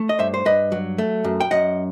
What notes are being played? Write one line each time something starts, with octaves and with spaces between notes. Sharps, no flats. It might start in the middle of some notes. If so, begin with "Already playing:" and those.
Already playing: A3
D#5
G2 C5 E5
C5
G2 B4 D#5
F#3
A3
F#2
G5
F#2 D#5 F#5